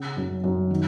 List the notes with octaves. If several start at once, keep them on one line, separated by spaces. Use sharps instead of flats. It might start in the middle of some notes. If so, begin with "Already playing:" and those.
Already playing: C#3 F#5
F#2
F#2
D#3